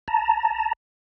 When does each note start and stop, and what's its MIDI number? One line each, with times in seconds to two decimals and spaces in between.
0.08 0.73 81
0.08 0.73 82